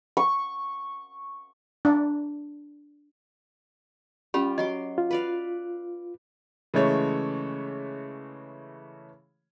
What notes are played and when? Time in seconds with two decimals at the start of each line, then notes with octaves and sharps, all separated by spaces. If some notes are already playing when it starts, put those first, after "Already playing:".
0.17 C#6
1.85 D4
4.34 G3 C#4 F4 G4 B5
4.58 F#3 D#5 C6 D6
4.98 F4
5.11 B4 D5 F5
6.74 C#3 E3 G#3 A3 C#5